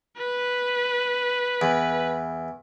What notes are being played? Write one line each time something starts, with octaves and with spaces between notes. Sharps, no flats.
B4
E2